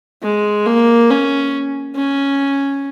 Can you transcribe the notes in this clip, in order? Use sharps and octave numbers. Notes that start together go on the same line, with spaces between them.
G#3
A#3
C#4
C#4